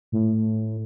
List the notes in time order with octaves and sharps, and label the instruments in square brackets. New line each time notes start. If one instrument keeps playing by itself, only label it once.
[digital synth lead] A2